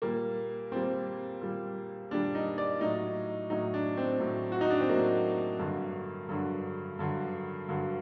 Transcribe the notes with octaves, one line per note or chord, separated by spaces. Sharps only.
A#2 G3 A#3
A#2 G3 C4
A#2 G3
A#2 G3 D4
D#4
D5
A2 F#3 D#4
A2 F#3 D#4
D4
C4
A2 F#3
F#4
D#4
D4
C4
A2 F#3 A#3
G2 D3 F#3
G2 D3 F#3
G2 D3 F#3
G2 D3 F#3